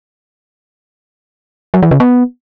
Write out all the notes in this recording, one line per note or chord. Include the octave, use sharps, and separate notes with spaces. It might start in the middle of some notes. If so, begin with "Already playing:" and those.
F#3
E3
C#3
B3